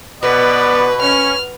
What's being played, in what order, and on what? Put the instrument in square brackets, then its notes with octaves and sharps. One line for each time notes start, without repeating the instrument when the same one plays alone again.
[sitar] B2 [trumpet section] B3 D5 [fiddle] B4
[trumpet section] C#4 [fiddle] F6